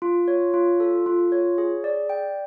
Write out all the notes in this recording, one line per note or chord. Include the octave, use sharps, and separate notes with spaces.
F4
C#5
F4
A4
F4
C#5
G#4
D5
G5